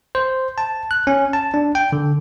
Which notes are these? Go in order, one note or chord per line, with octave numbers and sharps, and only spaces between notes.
C5
A5
F#6
C#4
A5
D4
G5
D3